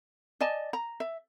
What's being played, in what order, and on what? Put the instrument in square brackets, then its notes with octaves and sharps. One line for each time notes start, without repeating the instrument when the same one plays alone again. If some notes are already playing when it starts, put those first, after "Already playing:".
[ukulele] D5 D#5 G#5 A5
A#5
E5